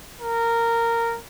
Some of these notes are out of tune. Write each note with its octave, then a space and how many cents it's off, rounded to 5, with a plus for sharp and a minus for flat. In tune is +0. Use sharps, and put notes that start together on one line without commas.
A#4 -10